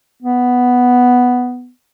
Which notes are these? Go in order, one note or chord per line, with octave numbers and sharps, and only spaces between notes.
B3